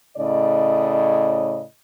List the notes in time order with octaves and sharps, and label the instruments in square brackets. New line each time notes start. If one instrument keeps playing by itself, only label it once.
[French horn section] A2 C#3 D5 D#5